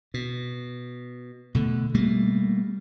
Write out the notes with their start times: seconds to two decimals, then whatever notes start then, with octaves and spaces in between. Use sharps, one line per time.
0.14 B2
1.54 B2 D3 A3
1.94 B2 G3 A3 A#3